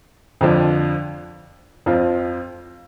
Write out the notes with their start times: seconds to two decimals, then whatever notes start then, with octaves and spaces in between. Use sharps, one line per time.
0.41 F2 D3 F3 D4
1.86 F2 F3 C4 F4